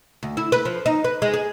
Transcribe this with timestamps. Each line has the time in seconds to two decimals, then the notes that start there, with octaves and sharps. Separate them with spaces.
0.23 D2
0.37 E4
0.52 B4
0.65 F3
0.86 D#4
1.04 B4
1.22 G#3
1.34 G#4